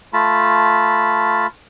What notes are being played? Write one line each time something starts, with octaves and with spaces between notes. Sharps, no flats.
A3 F4 A5 B5